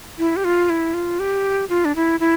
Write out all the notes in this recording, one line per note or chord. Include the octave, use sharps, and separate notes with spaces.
E4
G4
F4
E4
F4
G4
F4
D4
E4
E4